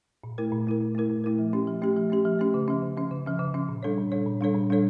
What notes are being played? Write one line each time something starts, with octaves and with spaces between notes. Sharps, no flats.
A#2
A3 E4 A#4
A#2
A3 E4 A#4
A#2
A3 E4 A#4
A#2
A3 E4 A#4
F3
A3 C#4 G4
F3
A3 C#4 G4
F3
A3 C#4 G4
F3
A3 C#4 G4
C#3
F3 C#4
C#3
F3 C#4
C#3
F3 C#4
C#3
F3 C#4
A#2
G3 D4 A4 C#5
A#2
G3 D4 A4 C#5
A#2
G3 D4 A4 C#5
A#2
G3 D4 A4 C#5